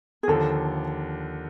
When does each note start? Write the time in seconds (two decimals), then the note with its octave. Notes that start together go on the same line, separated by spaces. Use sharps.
0.23 G#4
0.28 D#2 D3 F3 A4